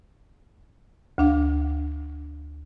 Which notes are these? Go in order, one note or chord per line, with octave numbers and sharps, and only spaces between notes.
D2 D4 F5